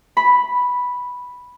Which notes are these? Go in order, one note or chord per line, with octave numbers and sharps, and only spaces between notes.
B5